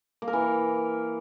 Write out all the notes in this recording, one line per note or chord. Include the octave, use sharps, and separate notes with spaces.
A#3
A#4
E3